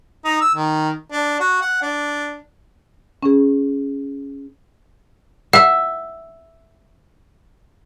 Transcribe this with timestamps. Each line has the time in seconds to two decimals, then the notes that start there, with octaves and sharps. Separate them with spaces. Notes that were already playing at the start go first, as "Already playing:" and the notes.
0.24 D#4
0.41 E6
0.55 D#3
1.12 D4
1.40 F#4
1.62 F#5
1.82 D4
3.23 C#4 G#4
5.53 E5 F#5